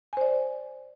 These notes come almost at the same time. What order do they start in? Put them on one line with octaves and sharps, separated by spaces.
G#5 C5 D5